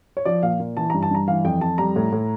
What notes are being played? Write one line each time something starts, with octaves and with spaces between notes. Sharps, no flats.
C#5
F3 D5
A#2 F5
A#2
E3 A5
G2 A#5
A5
G2 A#5
E3 F5
F2 G5
F2 A5
G3 A#5
A2
A2